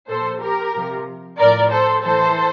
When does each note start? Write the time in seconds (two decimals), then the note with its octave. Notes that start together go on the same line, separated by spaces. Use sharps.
0.09 A#2 A4 C5
0.14 F3
0.41 G4 A#4
0.75 C3 F3
1.39 A2 F3 A#4 D5
1.71 A4 C5
2.03 A2 E3 A4 C5